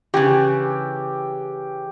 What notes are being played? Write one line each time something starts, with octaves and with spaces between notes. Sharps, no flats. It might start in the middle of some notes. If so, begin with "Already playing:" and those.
C#3 E3 G4